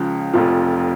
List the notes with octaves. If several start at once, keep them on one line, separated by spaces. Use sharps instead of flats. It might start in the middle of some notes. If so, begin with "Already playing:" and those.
Already playing: C#2 C#3 F3
F1 F2 F3